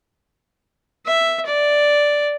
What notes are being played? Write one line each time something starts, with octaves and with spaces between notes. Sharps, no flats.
E5
D5